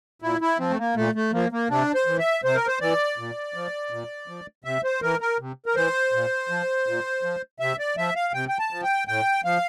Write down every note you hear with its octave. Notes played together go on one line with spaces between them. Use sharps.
A#2 E4
E4
F3 C4
A3
A#3
A#2 A3
A3
F3 A#3
A#3
C3 D4
C5
E3
E5
C3 C5
A#4
C5
E3 D5
A#2
F3
A#2
F3
C3 E5
C5
E3 A#4
A#4
C3
A#4
E3 C5
A#2
F3
A#2
F3
C3 E5
D5
F3 E5
F5
C3 G5
G5
A5
F3
G5
A2 G5
F3 F5